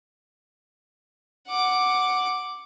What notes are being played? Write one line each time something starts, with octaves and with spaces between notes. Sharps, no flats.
F#5 D6